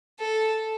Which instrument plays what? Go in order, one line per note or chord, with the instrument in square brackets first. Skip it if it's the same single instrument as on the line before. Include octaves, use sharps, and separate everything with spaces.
[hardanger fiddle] A4